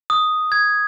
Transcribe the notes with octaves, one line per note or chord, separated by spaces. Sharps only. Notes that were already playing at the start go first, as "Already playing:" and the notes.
D#6
G#6